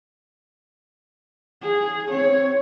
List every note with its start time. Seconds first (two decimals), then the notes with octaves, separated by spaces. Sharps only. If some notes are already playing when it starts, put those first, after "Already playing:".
1.62 G#4
2.10 C4 C#5